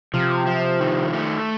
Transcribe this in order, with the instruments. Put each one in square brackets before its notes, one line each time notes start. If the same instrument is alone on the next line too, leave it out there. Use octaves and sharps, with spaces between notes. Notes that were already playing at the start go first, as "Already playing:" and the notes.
[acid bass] C3 [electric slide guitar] F3
[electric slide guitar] F3
D#3
A3